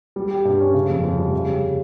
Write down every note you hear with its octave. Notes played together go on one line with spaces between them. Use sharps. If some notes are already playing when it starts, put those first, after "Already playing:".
G3
G4
G2
C#4
C#3
F2
F2
G3
C#3
G3